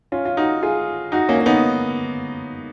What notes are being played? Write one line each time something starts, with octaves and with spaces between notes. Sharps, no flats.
C#4 F4
F4
D#4 F#4
F4 G#4
D#4 F#4
A#3 C#4
C#4
B3 D#4